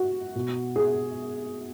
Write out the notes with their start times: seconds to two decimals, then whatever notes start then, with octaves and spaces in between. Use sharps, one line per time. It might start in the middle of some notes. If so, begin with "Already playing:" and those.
Already playing: F#4
0.35 B2
0.76 G#4